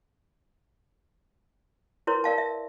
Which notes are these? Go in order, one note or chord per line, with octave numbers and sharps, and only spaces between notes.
E4 A#4 B4 C#5 C6
A#4 D5 F5 A5
E5